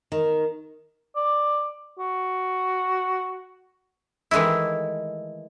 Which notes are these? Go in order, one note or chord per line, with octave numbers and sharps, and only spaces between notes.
D#3
D5
F#4
D#3 E3 G#3 A3 E4